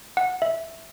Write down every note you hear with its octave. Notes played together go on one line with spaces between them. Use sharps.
F#5
E5